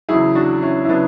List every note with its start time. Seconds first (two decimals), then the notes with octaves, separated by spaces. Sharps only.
0.09 E2 C#3 F#3 E4 G#4
0.35 D4 F#4
0.62 C#4 E4
0.85 E4
0.89 C#3 F#3 B3 D4